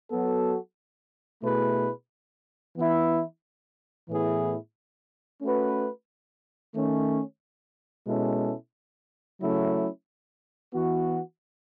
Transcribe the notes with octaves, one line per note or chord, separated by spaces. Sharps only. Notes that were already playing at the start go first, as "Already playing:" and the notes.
F#3 B3 F#4 A4
B2 A3 E4 G#4 B4
E3 B3 E4
A2 E3 B3 E4 G#4
A3 C#4 F#4 B4
D#3 A3 C#4
B2 G#3 C#4 E4 A4
C#3 F#3 A3 C#4 E4
E3 B3 F#4